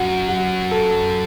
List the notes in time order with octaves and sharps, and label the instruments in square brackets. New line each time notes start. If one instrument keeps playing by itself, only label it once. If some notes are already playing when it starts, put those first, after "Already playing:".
Already playing: [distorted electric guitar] F#2 [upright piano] F#4
[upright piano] F#4
A4